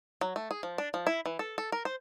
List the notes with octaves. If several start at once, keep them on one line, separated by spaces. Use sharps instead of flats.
F#3
A3
G#4
F3
D4
F3
E4
E3
A4
A4
A#4
C5